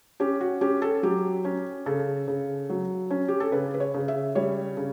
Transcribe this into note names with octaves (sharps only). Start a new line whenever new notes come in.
C#4 G4
F#4
C#4 G4
A4
F#3 G4
C#4
C#3 A4
C#3
F#3
C#4
G4
A4
C#3 B4
B4
C#5
C#3
E5
G3 C#5
C#3